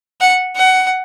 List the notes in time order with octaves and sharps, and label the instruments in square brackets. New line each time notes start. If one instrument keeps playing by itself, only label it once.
[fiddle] F#5
F#5